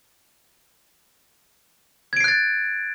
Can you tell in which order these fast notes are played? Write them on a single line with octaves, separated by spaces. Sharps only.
G#6 D7 C7 F#6 A6